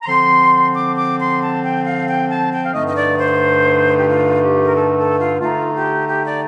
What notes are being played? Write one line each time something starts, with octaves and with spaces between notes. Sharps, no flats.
A#5
D3 F3 C4 C6
D6
D6
C6
A5
G5
F5
G5
A5
G5
F5
G2 D3 A3 D#4 D#5
D#5
D5
C5
G4
F4
G4
A#4
A4
A4
F4
D3 A3 D#4 F4
G4
G4
D5